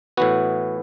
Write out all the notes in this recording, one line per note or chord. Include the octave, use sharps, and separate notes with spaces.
A2 E3 B3 F#4